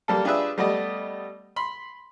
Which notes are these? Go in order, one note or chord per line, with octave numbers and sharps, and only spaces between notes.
G3 A#3 A4
D4 F4 G4 G#4 B4 E5
G3 A3 B3 D5 D#5
B5 C6